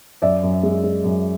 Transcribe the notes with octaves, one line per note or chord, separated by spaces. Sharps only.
F#2 D5 E5
F#2
G#3
G#3
F#2